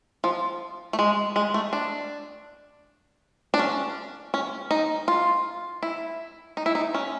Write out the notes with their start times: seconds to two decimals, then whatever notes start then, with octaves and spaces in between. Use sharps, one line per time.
0.24 F3
0.93 A3
0.99 G#3
1.36 G#3
1.54 A3
1.73 D4
3.54 D4
3.59 C#4
4.34 C#4
4.71 D#4
5.08 F4
5.83 E4
6.57 D#4
6.66 E4
6.75 D#4
6.94 C#4